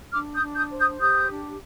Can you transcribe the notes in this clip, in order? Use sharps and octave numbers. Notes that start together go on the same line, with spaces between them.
D4 D6 F6
D#6 G6
D4
D#6 G6
C5
D#6 G6
G4 D#6 G6
D4